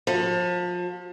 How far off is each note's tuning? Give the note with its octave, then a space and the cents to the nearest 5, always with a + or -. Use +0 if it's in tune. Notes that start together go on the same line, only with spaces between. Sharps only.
F3 +30